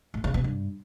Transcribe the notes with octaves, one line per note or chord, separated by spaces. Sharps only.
A2
C#3
B2
G2